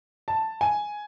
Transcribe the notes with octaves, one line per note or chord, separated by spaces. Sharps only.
A5
G#5